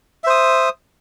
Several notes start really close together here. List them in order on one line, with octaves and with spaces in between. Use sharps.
E5 C5 D#6